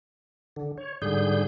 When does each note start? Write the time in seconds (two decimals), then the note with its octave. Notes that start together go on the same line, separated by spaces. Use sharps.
0.56 D3
0.78 C#5
1.02 G#2 D3 G3 G#4 G6